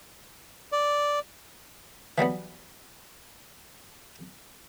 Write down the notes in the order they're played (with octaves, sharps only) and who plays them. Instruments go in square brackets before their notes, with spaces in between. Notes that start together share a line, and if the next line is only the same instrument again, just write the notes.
[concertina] D5
[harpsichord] E3 F#3 G3 B3